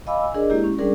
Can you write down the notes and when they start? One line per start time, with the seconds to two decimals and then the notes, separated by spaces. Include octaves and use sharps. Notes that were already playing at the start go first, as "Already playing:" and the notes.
0.07 D#5 F5 G#5 B5 D6 E6
0.20 G#5 E6
0.34 D4 G#4 A#4 D5 D#5
0.50 G#3 A#3 E4 G4
0.64 C#4
0.78 G3 C#4 D4 G#4 A#4 D5